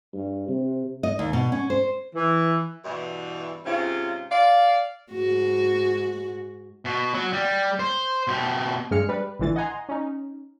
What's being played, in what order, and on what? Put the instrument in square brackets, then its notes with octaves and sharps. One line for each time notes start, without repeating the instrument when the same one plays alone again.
[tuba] G2
C3
[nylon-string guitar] D#5
D#2
B2
C#4
C5
[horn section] E3
[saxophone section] G2 B2 E3
G#2 C3 C#4 F4
D5 F5
[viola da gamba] G#2 F#4
[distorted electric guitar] B2
F#3
G3
C5
B2 G4
[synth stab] G2 G#3 F6 C#7
G3 B4
A1 D3 E3 A6
D#5 F#5 G#5 A#5 C6
C#4 D#4